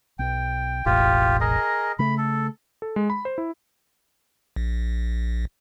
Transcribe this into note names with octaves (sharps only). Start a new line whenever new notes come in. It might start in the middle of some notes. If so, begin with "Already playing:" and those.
B1 G5
E1 A1 A2 F4 G4
G#4 A#4 D#5
C#3 A3 B5
A4
A4
G#3
B5
C5
E4
A#1